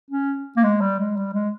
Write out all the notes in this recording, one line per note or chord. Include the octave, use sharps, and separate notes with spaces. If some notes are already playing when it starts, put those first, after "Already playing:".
C#4
A#3
G#3
G3
G#3
G3
G#3